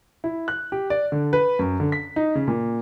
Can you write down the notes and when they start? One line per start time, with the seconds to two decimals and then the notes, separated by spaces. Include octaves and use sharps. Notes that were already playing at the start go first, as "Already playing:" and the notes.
0.24 E4
0.48 F#6
0.72 G4
0.90 D5
1.12 D3
1.33 B4
1.59 F#2
1.80 D3
1.92 B6
2.16 D#4
2.35 C#3
2.48 A#2